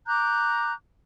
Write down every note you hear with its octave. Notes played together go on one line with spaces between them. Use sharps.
A#5 D6 F#6 G6